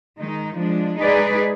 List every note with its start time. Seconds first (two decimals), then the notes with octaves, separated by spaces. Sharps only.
0.17 D#3 G#3 D#4
0.56 F3 G#3 D4
0.97 G#3 D#4 G#4 B4 D5